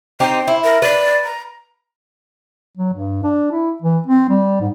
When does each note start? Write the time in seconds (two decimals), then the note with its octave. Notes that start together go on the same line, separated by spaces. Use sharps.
0.20 C4 D#4 G4 C5
0.48 E4
0.64 A#4
0.82 B4 D5
1.24 A#5
2.77 F#3
2.94 G2
3.23 D4
3.52 E4
3.82 E3
4.07 C4
4.30 G3
4.60 G#2